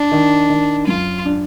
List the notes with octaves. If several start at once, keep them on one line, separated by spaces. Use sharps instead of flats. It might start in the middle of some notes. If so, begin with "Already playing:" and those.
Already playing: D4
D#3
D#3
F#2 F4
D4